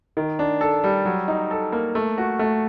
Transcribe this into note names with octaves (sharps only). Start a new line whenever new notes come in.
D#3
D4
A4
G3
F#3
D#4
A4
A#3
A3
F#4
A3